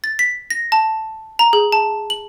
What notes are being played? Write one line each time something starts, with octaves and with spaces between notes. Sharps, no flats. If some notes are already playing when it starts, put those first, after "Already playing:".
A6
B6
A#6
A5
A#5
G#4
A5
F#7